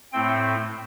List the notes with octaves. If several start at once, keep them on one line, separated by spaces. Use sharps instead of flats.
A2 A3 C4 G5